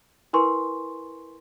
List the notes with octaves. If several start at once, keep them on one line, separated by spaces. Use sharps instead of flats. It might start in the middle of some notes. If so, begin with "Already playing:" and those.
E4 A#4 B4 G#5 C6 C#6